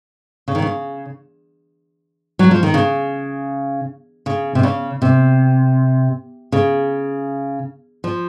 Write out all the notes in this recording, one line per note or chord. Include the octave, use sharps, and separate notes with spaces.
C#3
D#3
C#3
F#3
F3
D#3
C#3
C#3
C3
C#3
C3
C#3
F3